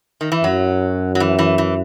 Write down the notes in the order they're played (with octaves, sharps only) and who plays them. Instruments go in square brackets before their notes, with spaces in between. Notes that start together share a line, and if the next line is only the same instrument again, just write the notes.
[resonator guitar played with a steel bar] D#3
E3
[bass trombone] F#2 [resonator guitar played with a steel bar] F#3
[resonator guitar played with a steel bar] F#3
E3
E3
E3